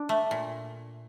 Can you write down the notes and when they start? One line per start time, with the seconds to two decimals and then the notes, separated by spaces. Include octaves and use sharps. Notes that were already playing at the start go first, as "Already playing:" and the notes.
Already playing: D4
0.09 A3
0.31 A#2